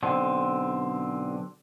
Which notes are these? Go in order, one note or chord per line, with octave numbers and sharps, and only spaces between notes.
B1 D3 C4